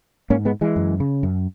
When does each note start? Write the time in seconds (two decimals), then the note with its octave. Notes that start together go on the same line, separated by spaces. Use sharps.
0.30 G#2 A#3 C#4
0.45 G#3 B3
0.61 E3 G#3
0.76 F#2
1.00 C#3
1.23 F#2